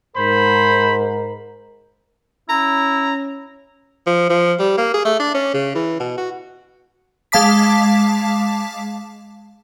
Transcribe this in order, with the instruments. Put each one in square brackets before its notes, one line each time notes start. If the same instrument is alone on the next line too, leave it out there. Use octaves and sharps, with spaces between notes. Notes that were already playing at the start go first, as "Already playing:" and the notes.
[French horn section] G#2 A#4 [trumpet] C5 [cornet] B5
[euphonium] C#4 [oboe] E4 [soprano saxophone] A#5
[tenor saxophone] F3
F3
G3
A#3
G#4
A3
D4
C#4
C#3
E3
B2
F#4
[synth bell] G#3 F5 A5 D6 B6